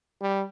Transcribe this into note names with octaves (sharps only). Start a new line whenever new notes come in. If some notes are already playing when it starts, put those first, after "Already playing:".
G3